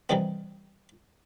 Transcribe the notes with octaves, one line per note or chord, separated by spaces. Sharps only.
C3 D#3 E3 G3 B3